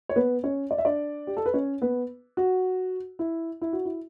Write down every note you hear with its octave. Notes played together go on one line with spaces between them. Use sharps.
C#5
B3 B4
C#4 C#5
D5
E5
D4 D5
G4
A4
B4
C#4 C#5
B3 B4
F#4
E4
E4
F#4
E4